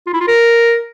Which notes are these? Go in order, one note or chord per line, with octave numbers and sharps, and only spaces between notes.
F4
E4
F4
A#4